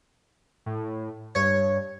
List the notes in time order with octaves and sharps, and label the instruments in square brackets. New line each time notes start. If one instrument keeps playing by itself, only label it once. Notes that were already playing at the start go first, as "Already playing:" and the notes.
[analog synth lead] A2
[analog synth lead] G2 [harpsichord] C#5